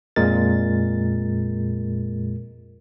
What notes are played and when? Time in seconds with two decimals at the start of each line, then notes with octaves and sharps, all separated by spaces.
0.16 F2 A#2 G#3 A#4 A6